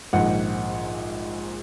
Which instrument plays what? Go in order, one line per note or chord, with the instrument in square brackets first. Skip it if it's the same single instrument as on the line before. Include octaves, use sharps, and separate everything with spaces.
[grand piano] A#1 G#2 D#3 F#5